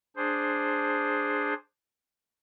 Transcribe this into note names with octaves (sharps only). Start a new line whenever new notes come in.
D4 G#4 C5